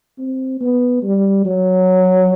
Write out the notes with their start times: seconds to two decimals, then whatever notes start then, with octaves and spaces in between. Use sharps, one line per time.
0.19 C4
0.61 B3
1.03 G3
1.45 F#3